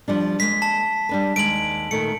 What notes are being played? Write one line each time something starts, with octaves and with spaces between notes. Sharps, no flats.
F3 G3 D4
G#3 A#3 B6
A5
G3 D4 B4
D#2 G#3 D7 F#7
A#2 D#3 A3 C#7